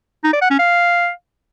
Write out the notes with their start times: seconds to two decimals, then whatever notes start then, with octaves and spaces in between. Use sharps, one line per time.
0.24 D#4
0.33 D5
0.42 F#5
0.50 C#4
0.59 F5